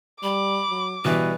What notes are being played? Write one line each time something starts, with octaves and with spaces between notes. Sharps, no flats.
G3 B5 D6
F#3
B2 E3 G3 B4